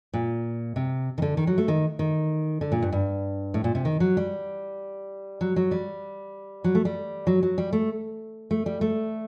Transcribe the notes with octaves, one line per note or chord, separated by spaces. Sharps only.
A#2
C3
D#3
D3
D#3
F#3
A3
D#3
D#3
D3
A#2
G2
G2
A2
A#2
C3
D#3
F#3
G3
F#3
F#3
G3
F#3
A3
G3
F#3
F#3
G3
A3
A3
G3
A3